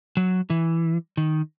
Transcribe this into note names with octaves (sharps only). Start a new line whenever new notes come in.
F#3
E3
D#3